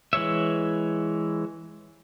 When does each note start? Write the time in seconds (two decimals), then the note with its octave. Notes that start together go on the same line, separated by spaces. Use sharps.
0.13 E3 G#3 C#5 E5